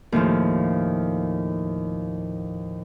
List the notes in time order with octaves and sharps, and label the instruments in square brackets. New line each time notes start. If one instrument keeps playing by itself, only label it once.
[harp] D#2 A2 F3